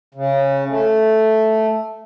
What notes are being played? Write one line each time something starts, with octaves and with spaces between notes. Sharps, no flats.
C#3
A3